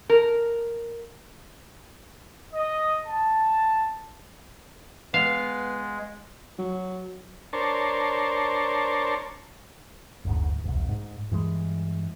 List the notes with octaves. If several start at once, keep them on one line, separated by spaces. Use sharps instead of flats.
A#4
D#5
A5
G#3 B3 F5
F#3
D4 A#4 C5 C#5 A5
F#1 D2 G#2
E1 C2
G#2
G2 E3 G#3